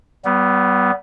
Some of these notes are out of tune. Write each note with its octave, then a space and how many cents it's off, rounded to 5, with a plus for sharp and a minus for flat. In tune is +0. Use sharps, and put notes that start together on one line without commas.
G3 -35 B3 +0